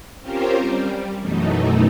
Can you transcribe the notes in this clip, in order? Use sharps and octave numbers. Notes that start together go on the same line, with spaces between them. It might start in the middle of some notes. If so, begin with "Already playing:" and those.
C4 C#4 F4 G4 A#4 C5
G3
F#2 B2 E3 A3 D#4